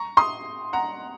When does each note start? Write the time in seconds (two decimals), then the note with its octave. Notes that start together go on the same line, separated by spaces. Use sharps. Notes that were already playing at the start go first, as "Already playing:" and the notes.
Already playing: A#5 C#6
0.17 C6 D#6
0.73 F#5 A#5